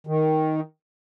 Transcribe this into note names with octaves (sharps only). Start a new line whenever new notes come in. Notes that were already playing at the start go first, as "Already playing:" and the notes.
D#3